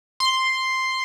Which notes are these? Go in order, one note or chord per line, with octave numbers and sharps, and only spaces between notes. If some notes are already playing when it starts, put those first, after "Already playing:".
C6